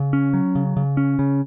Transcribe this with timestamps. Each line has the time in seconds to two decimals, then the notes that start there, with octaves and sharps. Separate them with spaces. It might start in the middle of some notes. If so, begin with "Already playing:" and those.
Already playing: C#3
0.13 C#4
0.34 F#3
0.55 C#3
0.77 C#3
0.97 C#4
1.19 C#3